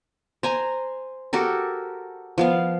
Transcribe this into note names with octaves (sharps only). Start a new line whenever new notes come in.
C5 G#5 A#5
F#4 G4 A4 A#4
F3 B3 F5